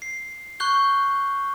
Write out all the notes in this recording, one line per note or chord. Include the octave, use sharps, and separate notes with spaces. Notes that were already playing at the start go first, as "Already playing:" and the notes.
C7
C#6 F#6 G6 G7